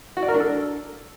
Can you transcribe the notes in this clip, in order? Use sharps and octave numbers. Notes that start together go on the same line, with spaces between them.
F#4
D5
A#4
D4
A4